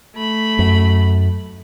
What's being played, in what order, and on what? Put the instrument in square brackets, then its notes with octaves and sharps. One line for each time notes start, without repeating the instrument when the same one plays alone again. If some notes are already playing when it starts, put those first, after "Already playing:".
[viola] A3 B5
[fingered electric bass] F#2